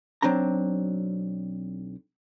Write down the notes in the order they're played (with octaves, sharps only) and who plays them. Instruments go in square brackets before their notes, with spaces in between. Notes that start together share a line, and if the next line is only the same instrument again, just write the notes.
[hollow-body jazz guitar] B1 F#3 C4 D4 A#5